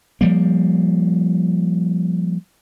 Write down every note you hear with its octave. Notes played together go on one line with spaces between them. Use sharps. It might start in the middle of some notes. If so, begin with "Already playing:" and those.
F3 G3 A#3